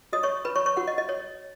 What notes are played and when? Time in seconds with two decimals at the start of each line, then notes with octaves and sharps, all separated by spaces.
0.13 F#4 C#5 D#5 D#6
0.23 C#5 C#6
0.45 B4 B5
0.55 C#5 C#6
0.66 C#5 C#6
0.77 F#4 C#5 F#5
0.88 D#5
0.98 D#5
1.09 C#5